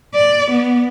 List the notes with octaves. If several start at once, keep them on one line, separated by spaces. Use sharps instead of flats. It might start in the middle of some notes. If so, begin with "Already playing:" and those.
D5
B3